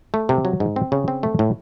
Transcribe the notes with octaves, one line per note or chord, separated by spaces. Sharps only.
A3
C3
F#3
G#2
C4
C#3
C4
A3
A2